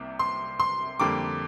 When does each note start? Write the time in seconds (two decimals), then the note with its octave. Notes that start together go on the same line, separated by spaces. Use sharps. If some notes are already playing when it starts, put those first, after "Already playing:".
Already playing: C2 C3 A#3
0.19 C6
0.60 C6
1.00 F2 D3 G3 A#3 D6